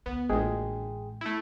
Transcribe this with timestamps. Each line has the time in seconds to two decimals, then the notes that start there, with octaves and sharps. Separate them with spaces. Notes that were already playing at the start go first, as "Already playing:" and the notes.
0.06 D2 B3
0.29 A1 D2 A#2 G#3 G#4 G5
1.21 A3 E4